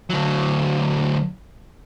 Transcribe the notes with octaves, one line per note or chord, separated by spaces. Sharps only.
D2 F#3